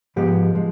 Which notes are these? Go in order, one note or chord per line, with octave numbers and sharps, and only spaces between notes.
G#2 F3 G#3 B3 G4
F3 G#3